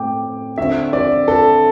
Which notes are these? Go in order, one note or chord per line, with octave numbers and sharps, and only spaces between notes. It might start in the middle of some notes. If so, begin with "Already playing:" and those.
Already playing: A2 A3 C4 G5 D6
D3 C4 E5
D5
A4